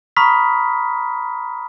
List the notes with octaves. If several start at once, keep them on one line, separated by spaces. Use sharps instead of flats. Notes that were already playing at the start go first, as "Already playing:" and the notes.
A#5 B5 C#6 D#6 F6 B6